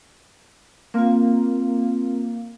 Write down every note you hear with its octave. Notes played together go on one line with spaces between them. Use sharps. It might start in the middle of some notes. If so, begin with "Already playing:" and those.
A#3 C4 F4